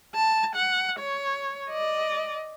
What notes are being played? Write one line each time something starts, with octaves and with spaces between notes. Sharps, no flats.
A5
F#5
C#5
D5 D#5